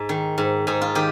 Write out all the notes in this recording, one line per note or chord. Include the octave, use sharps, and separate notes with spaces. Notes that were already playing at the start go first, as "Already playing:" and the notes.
Already playing: G#2
D#3
G#2
G#2 D#4
F4
D#3 G4